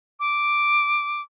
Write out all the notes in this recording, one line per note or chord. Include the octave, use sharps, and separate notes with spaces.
D6